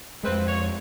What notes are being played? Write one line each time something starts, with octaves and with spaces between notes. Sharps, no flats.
F2 G#3 C4 B4
C#5